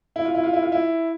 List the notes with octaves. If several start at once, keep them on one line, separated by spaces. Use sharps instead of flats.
E4
F4
E4
F4
E4
F4
E4